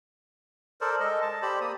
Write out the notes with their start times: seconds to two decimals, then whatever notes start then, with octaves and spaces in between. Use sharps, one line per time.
0.81 A4 A#4 C5 D5
1.00 G#3 A4 D#5
1.22 A5
1.42 G4 C5 D5 B5
1.61 A#3 D#6